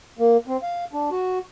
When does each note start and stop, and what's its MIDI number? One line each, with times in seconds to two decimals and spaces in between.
0.19 0.37 58
0.47 0.57 60
0.63 0.85 77
0.93 1.09 62
1.11 1.39 66